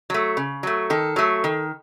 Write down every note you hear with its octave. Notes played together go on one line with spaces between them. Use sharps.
F#3 A3
C#3
F#3 A3
D#3 A4
F#3 A3
D#3